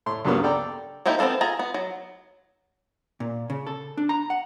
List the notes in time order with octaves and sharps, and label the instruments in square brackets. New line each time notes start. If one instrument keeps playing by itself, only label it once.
[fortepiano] A2 C6
C#2 G2 C#3 F#3 A#3 B3
A4 D5 G5 A5 A#5
[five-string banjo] F3 A#3 D#4 E4 G4
B3 C4 D4 A4 F5
F4 G#4 A#5
B3
F#3
[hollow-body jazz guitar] A#2
C#3
A4
D4
A#5
F#5